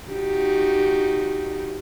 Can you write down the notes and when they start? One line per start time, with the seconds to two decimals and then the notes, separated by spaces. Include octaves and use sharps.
0.10 D#4 F#4 G4